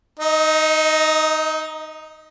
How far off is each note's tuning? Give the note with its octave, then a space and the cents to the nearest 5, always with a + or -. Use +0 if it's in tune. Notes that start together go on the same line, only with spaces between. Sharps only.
D#4 +0 D#5 +35